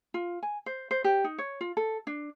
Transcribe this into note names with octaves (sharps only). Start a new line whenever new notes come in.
F4
G#5
C5
C5
G4
D#4
C#5
F4
A4
D4